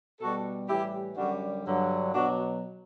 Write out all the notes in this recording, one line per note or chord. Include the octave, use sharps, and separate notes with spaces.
B2 G3 F#4 A4
A2 E3 G3 E4 G4
F#2 D3 G3 D4 F#4
G2 D3 F#3
B2 F#3 D4 F#4